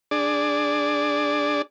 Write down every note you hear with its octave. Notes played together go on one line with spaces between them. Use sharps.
D4 G#4 D5